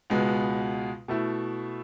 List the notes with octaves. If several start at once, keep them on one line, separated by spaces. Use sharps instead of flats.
C#2 B2 G#3 B3
B2 A3 E4